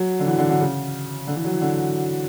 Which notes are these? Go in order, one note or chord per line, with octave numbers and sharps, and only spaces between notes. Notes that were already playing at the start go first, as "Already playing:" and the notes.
Already playing: F#3
D3
E3
D3
D3
C#3
D3
E3
F#3
E3
D3